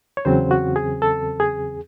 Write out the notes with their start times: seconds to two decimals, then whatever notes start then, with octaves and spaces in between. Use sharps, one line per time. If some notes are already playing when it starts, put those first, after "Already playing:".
0.17 C#5
0.25 E2 C#3 F#3 C4 C5
0.51 F#4
0.76 G#4
1.02 A4
1.40 G#4